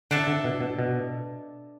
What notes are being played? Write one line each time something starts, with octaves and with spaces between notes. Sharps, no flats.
D3 D4 A4 E5 A5
D3
B2
B2
B2